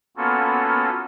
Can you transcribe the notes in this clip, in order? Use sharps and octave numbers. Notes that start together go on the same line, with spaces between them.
A#3 B3 C#4 F4 F#4 A4